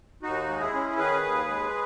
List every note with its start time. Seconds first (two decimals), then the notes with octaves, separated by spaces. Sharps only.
0.23 D#2 D#4 F#4
0.48 G#3
0.60 E4 G#4
0.74 C#4
0.98 D#3 G#4 B4
1.24 D#2
1.48 G#3